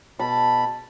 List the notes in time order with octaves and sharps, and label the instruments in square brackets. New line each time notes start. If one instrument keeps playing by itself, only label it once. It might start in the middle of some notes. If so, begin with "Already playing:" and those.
[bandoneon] B2 B5 [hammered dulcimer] A5